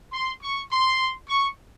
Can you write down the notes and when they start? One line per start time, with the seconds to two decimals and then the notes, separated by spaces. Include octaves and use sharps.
0.13 C6
0.42 C#6
0.71 C6
1.28 C#6